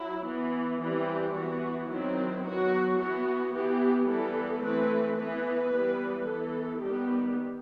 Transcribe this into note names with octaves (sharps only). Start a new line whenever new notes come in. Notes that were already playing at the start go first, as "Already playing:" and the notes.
Already playing: F#3 E4
E3 B3
E3 G3 C4 G4
E3 B3 F#4
D#3 F#3 C4 E4
F#3 B3 F#4
E3 B3 F#4
E3 B3 G4
E3 G3 B3 A4
E3 A3 C4 B4
E3 B3 B4
E3 G3 B3
E3 B3 A4
D#3 G3 B3 G4